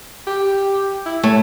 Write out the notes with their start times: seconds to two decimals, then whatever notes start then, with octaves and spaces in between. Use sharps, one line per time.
0.27 G4
1.06 E4
1.23 A3 C#5